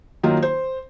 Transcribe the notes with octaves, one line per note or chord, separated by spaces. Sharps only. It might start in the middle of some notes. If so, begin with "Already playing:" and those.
D#3 F#3 A#3 D#4 F4
C5